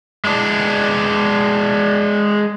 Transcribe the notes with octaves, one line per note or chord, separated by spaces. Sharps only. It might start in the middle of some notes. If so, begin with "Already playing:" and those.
G#3 D4